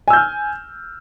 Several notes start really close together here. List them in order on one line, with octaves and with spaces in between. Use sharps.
G#5 E6 G6 F6